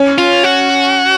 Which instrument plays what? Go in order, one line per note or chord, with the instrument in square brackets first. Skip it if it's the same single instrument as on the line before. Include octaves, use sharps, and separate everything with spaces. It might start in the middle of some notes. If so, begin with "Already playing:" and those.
Already playing: [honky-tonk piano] C#4
[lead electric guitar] F4
F#4